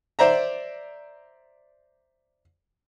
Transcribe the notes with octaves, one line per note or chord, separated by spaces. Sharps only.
C5 D5 E5 A#5